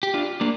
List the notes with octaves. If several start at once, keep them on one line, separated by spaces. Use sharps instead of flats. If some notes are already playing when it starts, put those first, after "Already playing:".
G4
D4 F4
A#3 D4